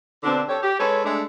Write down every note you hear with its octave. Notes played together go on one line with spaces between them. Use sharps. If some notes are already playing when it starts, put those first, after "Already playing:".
B2 D3 C4 D4
G4 A4 C#5
G4
G#3 A4 B4 C#5
G#3 A3 D4